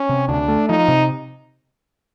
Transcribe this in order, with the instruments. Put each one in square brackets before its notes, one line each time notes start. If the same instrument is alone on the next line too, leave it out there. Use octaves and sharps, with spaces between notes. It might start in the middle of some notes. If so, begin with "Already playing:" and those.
Already playing: [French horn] C#4
[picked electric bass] C3
[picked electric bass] D2 [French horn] D4
[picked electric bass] A3
[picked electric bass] F3 [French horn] D#4
[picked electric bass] C3